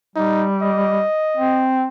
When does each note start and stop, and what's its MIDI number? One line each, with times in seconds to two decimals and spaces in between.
0.16 1.03 55
0.16 0.47 63
0.62 1.68 75
1.37 1.87 60